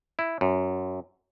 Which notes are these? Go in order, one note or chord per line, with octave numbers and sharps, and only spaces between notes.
E4
F#2